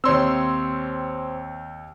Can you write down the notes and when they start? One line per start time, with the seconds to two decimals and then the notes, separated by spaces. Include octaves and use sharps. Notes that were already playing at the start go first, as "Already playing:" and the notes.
0.04 D#2 C4 C#5 C6 E6